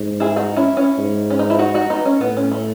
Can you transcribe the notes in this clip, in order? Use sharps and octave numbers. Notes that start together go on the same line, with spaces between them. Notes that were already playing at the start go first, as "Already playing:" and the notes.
Already playing: G#2
E4 G#4
D#4 F#4
C#4 E4
C#4 E4
G#2
C#4
D#4
E4
D#4 F#4
D#4 F#4
B3 D#4
C#4
A2 B3
C#4
A3